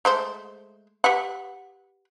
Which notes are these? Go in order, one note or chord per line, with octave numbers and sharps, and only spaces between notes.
G#3 A3 C5
G4 B4 F#5